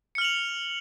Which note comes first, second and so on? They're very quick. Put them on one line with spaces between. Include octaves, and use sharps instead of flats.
C#7 F6 F#7 F7